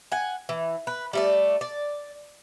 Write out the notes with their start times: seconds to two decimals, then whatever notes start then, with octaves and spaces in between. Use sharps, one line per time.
0.12 F#5 G#5
0.49 E3
0.87 B4
1.13 G3 A3 D5
1.61 D5